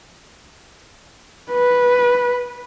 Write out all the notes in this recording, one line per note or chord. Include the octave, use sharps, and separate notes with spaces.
B4